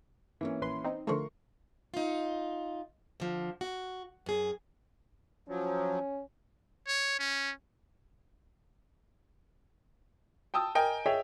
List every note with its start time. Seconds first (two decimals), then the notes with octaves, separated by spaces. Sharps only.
0.41 E3 A#3 C#4
0.62 A#1 B4 C6
0.84 C4 D#4
1.07 D3 F3 A3 A#4 C6 C#6
1.94 D#4 F4
3.20 D3 F3
3.61 F#4
4.26 F#2 G#4
5.49 F3 F#3 C#4
6.87 C#5
7.19 C#4
10.54 G5 A5 D#6 E6
10.75 A#4 D#5 G5 G#5
11.06 G#4 C#5 D#5 E5 G5